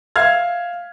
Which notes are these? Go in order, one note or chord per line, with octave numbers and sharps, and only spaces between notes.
E5 F5 F6 G#6